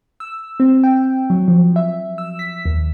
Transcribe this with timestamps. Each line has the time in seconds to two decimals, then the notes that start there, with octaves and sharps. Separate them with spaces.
0.20 E6
0.60 C4
0.84 G5
1.30 F#3
1.48 F3
1.76 E5
2.18 E6
2.39 B6
2.65 D#2